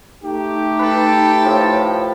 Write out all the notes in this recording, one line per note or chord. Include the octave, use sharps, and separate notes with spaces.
A3 D#4 G4
A4 B4 G5
A2 F3